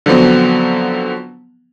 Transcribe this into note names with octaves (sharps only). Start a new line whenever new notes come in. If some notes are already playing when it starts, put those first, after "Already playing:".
D3 F3 F#3 B3 C4